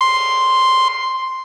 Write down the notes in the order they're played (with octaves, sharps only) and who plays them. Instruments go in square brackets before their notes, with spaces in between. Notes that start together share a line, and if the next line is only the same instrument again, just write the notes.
[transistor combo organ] C6